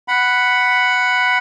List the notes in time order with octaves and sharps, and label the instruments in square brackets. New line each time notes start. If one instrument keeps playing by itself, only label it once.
[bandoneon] F#5 B5